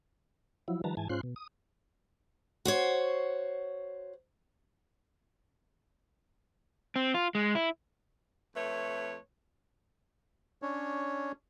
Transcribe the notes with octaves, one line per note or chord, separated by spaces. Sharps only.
F3 F#3 E4
D#3 F3 G3 B4 A5 A#5
G#2 E3 G#5 A5
G#2 C#4 F4 C5 C6 F#6
B2
D#6
F#4 C5 C#5
C4
F4
G#3
E4
F2 A3 B4 C#5
C#4 D4 C#5